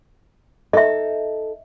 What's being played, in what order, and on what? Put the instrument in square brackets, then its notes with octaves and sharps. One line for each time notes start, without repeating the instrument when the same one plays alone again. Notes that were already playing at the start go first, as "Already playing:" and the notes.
[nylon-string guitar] D#4 A4 [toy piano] D#5 E5